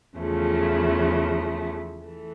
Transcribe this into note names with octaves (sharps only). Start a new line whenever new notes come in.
E2 C#3 F3 A3
E3 A3